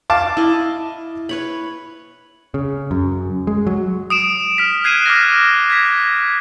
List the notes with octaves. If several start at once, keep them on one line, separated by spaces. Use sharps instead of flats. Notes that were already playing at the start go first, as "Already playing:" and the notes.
F5 A5 D6
E4 D#5
B4 C#5 B5
C#3
F#2
G#3
F#3
D#6 D7 E7
F6 B6
F#6 G#6 C7 D#7 E7
D6 F6 A#6
G#6 B6